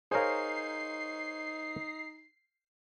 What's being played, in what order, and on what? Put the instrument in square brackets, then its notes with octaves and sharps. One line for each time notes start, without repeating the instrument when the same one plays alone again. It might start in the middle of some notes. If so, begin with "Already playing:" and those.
[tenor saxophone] D#4 [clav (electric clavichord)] G#4 A#4 [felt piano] C5 C#5 F5 [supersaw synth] C7